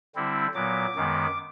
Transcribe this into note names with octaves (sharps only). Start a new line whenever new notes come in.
D3 G3 C4 E4
A#2 F#3 B3 D6
F#2 D#3 G#3 B3